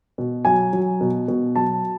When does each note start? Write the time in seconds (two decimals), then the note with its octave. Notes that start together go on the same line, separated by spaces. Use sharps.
0.18 B2
0.45 F#3 G#5
0.73 F#3
1.01 B2
1.28 B2
1.55 F#3 A5